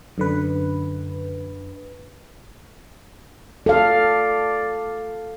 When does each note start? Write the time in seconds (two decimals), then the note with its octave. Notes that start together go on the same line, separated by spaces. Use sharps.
0.18 F#2 D3 B4
3.66 A4 D5 F5